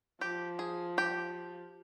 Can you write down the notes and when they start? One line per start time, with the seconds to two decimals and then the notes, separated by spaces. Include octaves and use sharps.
0.21 F3 G4
0.59 G#4
0.98 G4